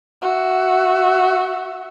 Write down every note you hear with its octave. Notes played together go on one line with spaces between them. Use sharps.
F#4 E5